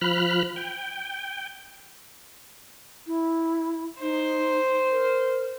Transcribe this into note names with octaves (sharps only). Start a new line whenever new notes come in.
F3 B5 F6 F#6
G5
E4
D#4 C5
A#4